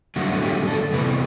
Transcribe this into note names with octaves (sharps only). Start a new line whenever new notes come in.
G2 D3 F#3 A3 F#4
G4
A4
C3 E3 B3 B4